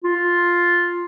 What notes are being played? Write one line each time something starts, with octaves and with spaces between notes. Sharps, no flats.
F4